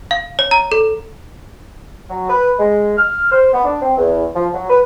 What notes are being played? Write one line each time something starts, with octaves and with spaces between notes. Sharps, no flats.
F5
C#5
A#5
A4
F#3
B4
G#3
F6
C5
B3
D4
C4
E2
F3
F#3
B4